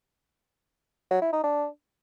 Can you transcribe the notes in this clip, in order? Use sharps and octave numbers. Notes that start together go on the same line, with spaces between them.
F#3
E4
D#4
D4